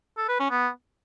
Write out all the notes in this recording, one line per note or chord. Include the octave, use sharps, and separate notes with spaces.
A4
B4
C#4
B3